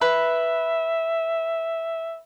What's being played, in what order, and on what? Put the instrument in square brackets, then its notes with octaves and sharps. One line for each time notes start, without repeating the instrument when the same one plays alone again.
[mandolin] B4 [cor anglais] E5